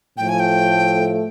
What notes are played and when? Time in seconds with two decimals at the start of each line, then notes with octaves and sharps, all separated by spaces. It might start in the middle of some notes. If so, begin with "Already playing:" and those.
0.17 A2 F3 A3 G5
0.29 G#5
0.40 G5